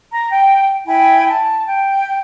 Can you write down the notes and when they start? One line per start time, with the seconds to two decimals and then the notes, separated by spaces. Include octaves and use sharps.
0.10 A#5
0.29 G5
0.85 E4 G5 G#5 B5
1.28 A5
1.66 G5